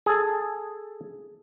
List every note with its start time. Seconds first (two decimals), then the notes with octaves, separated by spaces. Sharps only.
0.06 G#4 A4